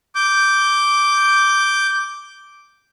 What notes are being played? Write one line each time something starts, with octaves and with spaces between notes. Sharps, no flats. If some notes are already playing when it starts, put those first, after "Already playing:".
D6 G6